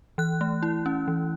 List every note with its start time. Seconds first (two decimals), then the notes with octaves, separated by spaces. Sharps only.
0.18 E3 F#6
0.41 A3
0.63 E4
0.86 C#4
1.08 E3